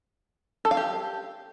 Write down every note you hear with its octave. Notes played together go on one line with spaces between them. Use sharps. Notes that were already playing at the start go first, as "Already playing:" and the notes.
A4
F5
G4